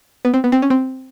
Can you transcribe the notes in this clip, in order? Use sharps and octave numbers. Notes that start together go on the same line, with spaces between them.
B3
C4
B3
C4
C#4
C4